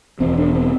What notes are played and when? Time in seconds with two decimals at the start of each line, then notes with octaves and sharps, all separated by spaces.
0.20 E1 E2 B2 C4
0.38 D4
0.55 C4